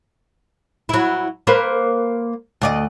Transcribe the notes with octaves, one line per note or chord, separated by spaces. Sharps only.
F#3 E4
A#3 B4 C5
D2 D5 D#5